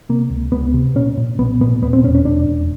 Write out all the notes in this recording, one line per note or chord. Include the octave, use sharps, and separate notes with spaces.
C3 A#3
C#2
C#2 B3
C3
A#2 C#4
A#2
B1 B3
A#2 B3
D#2 B3
C4
E1 C#4
C#4
E1 D4
E1